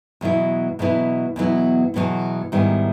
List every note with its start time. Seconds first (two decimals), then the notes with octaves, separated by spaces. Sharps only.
0.21 E2 B2 F#3 B3 E4
0.79 E2 B2 F#3 B3 E4
1.36 E2 B2 F#3 B3 E4
1.94 E2 B2 F#3 B3 E4
2.52 G#2 D#3 G3 B3 E4